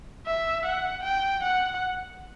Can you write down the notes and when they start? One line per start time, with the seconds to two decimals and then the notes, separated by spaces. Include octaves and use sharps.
0.26 E5
0.65 F#5
1.04 G5
1.43 F#5